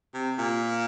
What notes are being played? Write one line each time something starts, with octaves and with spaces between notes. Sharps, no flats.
C3
A#2